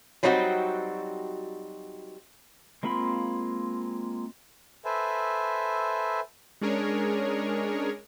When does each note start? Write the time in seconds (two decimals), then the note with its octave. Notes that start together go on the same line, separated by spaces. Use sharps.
0.23 F#3 G3 C4 D#4 F4 F#4
2.83 G#3 A#3 C4 F4 B5
4.85 A4 B4 C5 E5 G#5
6.61 G#3 C#4 D4 G#4 A#4 C#5